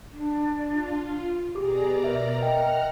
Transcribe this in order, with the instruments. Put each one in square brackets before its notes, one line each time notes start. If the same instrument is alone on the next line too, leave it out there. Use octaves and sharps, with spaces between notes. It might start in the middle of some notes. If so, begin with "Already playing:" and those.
[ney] D4
[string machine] F4
[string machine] B2 D5 A#5 [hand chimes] G4 D6 [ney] G#4
[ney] A#4 [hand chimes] E5
[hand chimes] D#5 E5 G5 [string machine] F#5 A#5 F6